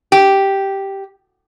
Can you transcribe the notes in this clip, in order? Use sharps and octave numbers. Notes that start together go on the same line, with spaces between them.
G4